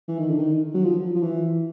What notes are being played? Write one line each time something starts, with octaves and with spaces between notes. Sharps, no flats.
E3
D#3
D3
D#3
F#3
F3
F3
E3